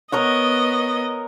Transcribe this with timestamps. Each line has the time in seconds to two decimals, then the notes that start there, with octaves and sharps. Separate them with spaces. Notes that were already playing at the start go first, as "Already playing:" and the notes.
0.12 B3 A#4 C#5 D#5 F#5